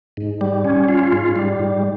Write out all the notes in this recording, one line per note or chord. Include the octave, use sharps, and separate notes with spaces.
G#2
G3
C#4
F4
G#2
G3
G#2